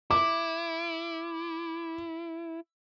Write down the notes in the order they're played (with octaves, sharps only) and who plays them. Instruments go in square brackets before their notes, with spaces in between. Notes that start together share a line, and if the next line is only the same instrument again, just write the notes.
[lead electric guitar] E4 [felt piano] D6